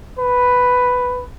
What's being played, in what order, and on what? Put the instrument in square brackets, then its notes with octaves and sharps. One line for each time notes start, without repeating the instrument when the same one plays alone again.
[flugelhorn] B4